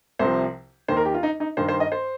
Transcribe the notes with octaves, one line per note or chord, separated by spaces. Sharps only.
C2 C3 F3 C5
D#2 D#3 C5
A#4
G4
F4
D#4
D#4
G2 D#3 C5
C5
D#5
C5